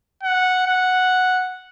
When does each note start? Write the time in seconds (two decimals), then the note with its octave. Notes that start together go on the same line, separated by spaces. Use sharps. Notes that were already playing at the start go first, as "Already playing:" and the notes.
0.23 F#5
0.66 F#5